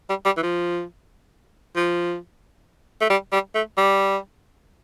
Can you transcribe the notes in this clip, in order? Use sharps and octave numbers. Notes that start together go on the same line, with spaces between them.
G3
G3
E3
F3
F3
A3
G3
G3
A3
G3